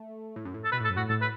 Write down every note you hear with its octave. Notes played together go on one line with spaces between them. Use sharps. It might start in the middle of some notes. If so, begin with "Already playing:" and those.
Already playing: A3
A2
F#2
A2
A4
B2 B4
A2
A4
F#2
A2 F#4
A2 A4
B4